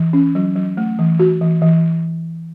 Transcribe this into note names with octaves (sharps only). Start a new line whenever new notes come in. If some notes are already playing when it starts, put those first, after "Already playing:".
Already playing: E3
C#4
F#3
F#3
A3
E3
F#4
E3
E3